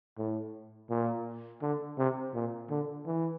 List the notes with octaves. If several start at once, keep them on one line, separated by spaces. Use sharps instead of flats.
A2
A#2
D3
C3
A#2
D3
E3